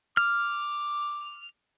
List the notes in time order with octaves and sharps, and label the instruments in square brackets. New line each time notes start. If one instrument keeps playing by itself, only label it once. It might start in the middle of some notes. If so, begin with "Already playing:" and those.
[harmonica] D6 [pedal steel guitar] F6